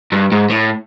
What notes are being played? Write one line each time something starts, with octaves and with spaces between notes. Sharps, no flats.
G2
G#2
A2